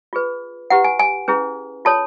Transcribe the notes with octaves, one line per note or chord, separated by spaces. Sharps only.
F4 G#4 B4
E4 G4 B4 F#5
G#5
G#5
C#4 E4 G#4 B4
F4 A4 C#5 A5